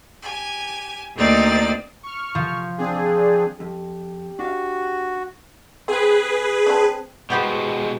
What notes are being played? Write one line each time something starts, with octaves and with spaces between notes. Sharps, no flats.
G4 G#5
D2 A#3 C4 D#4 D5 A6
C#6 F6
F3
C4 D4 G#4
F2 G4
D4 F#4 F5
C4 G#4 B4
C4 D4
B2 G#3 B3 G4 C5